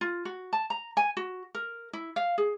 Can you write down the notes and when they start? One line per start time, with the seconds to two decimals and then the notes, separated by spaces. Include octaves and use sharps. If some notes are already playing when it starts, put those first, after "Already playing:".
0.01 F4
0.25 F#4
0.53 A5
0.70 A#5
0.97 G#5
1.17 F#4
1.55 A#4
1.93 E4
2.16 F5
2.38 G#4